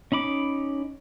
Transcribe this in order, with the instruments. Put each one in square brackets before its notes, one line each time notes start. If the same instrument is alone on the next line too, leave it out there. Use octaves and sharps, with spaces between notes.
[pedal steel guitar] C#4 D#4 B5 D6